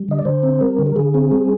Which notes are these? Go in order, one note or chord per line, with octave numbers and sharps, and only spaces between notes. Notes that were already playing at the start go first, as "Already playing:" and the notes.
Already playing: G3
D3 D#5
D5
D3 C5
C4
G3 A#4
D3
A#4
D3 G#4
C4
G3